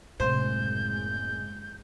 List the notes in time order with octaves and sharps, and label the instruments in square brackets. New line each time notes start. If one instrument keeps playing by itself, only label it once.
[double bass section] F#1 G#3 [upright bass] A2 C3 [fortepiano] C5 [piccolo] G6